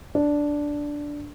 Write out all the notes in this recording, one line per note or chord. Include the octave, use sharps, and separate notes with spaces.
D4